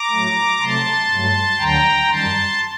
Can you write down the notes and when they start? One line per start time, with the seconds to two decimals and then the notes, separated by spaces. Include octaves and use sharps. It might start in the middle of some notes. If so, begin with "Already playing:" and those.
Already playing: A#5 D6
0.09 A2 F#3 A3
0.59 C3 F#3 A3 A5 C6
1.09 G2 F#3 A3
1.58 D2 D3 F#3 G5 A#5
2.08 F#2 D#3 G3 A5 C6